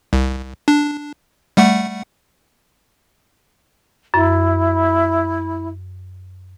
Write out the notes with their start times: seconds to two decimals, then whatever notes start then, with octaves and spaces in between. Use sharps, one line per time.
0.13 C2
0.68 D4
1.57 G3 A3 F#5
4.14 F#2 E4